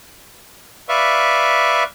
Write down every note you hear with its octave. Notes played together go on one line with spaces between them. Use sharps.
B4 D5 E5 F5 C#6